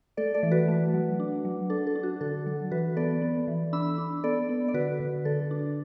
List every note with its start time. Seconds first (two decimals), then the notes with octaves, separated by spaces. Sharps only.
0.17 A3 A4 D5
0.34 A4 D5
0.43 E3
0.51 F#4 B4
0.68 A3
0.94 F#3
1.20 D4
1.45 F#3
1.70 D4 A4
1.87 A4
1.95 D4
2.03 F#4
2.21 D3 A4
2.46 F#3
2.71 E3 F#4 B4
2.97 B3 A4 D5
3.22 B3
3.48 E3
3.73 D4 B5 E6
3.98 D4
4.24 B3 A4 D5
4.49 B3
4.68 D5
4.74 D3 F#4 B4
5.00 D3
5.25 D3 A4
5.51 D4